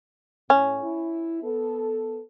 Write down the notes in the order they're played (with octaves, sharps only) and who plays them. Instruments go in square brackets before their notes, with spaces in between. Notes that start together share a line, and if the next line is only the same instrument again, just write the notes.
[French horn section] A2 [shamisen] C#4
[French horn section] E4
B3 A4